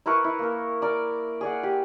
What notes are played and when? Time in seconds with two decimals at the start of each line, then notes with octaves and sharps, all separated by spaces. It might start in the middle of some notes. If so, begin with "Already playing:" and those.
0.06 E4 A#4 B4 C#6
0.24 E4
0.39 A#3 A#4
0.82 A#4 D5
1.41 G#4 D5 F#5
1.63 G4